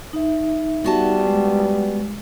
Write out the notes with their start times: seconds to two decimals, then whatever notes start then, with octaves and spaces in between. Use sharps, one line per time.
0.13 D#4 E5
0.84 G3 B3 F#4 A5
1.27 G#3